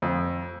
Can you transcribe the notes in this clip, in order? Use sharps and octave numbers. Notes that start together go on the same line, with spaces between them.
F2